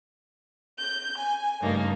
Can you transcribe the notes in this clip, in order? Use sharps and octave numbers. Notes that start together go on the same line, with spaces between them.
G6
G#5
G2 C#3 A3 A#3 D#4